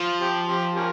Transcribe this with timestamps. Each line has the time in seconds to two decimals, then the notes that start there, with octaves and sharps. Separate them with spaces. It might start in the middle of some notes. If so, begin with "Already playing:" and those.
Already playing: F3
0.21 C4 G4
0.48 C4 G4
0.76 C#4 G4 A#4